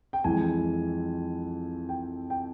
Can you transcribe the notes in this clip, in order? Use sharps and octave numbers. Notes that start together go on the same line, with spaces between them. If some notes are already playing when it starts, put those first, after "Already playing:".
G5
F2 E3 G#3 G#5
G5
G5